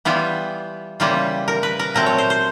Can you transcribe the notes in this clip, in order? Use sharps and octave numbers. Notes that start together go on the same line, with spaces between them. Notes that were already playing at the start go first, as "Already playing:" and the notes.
E3 G3 B3 F4
C#3 E3 G3 A#3 F4
A#4
B4
A#4
A#2 F#3 A3 C4 A#4
C#5
C5
C5